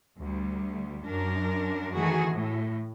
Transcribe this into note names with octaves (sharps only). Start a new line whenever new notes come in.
D2 G3
F#2 D4 A#4
D#3 E3 A3 F#4 G#4
A2